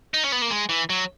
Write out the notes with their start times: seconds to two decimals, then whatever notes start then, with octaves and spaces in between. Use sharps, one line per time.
0.14 D#4
0.24 C#4
0.32 B3
0.42 A#3
0.50 G#3
0.69 E3
0.90 F#3